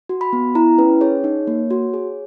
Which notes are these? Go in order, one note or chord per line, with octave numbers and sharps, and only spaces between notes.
F#4
B5
B3
E4 A#5
C#4 B4
G#4 C#5
D#4
A#3
F#4
G#4